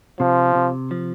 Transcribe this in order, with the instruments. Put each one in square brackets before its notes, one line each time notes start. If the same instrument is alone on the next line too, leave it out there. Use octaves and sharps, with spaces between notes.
[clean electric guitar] C3 [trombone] F3
[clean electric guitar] C3
F3